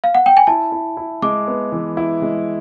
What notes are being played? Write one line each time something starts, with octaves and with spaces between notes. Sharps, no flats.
F5
F#5
G5
G#5
E4 A5
E4
E4
G#3 D6
B3
E3
E4
G#3